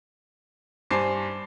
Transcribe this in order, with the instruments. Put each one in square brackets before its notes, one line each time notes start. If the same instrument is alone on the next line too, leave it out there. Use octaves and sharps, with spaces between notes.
[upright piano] G2 C5 G#5 A5 D6 C7